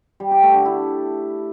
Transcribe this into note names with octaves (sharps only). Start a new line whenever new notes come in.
G3
G4
A3
D3
E4